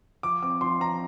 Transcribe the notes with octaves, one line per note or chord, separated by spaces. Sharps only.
F3 D6
C4 D6
F3 C6
C4 A#5